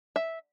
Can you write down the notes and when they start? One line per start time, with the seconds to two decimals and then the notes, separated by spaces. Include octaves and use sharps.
0.16 E5